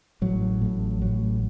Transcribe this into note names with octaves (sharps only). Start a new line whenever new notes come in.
A1 A2 F#3
A1 A2
A1 A2 F#3